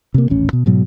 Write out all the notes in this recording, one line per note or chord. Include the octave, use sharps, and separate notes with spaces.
C3 A#3
D#1 A1 C#4
B2
G#2 B2 F#3